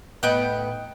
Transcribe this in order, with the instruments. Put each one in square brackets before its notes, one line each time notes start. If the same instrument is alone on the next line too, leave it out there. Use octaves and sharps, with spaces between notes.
[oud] A2 B3 [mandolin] D#4 G5 F#6